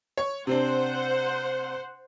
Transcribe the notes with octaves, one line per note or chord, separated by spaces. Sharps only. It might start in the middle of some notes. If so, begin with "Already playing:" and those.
C#5 C#6
C3 C4 D4 C5 F#5